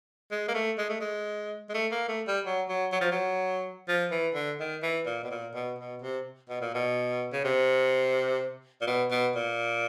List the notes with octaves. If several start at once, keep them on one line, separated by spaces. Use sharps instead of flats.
G#3
A#3
A3
G#3
A3
G#3
G#3
A3
A#3
A3
G3
F#3
F#3
F#3
F3
F#3
F3
E3
D3
D#3
E3
A#2
B2
A#2
B2
B2
C3
B2
A#2
B2
C#3
C3
A#2
B2
B2
A#2